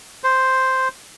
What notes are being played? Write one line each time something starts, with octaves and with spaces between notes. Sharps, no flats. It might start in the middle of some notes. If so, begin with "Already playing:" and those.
C5